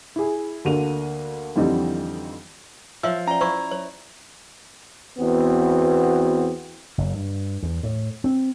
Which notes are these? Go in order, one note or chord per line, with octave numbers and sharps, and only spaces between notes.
E4 G#4
D2 D3 A#3 F#4 D#7 F7
F2 D3 E3 G3 C4 D#4
F3 C#5 E5 E6
C#4 D5 A#5
E4 C5 C#6
C#5
E2 B3 C4 F#4
F#1
G2
E2
A2
C4